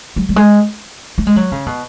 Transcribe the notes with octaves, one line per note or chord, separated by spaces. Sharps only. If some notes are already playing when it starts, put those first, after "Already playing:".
F#3
F#3
G#3
A3
G#3
F#3
C#3
B2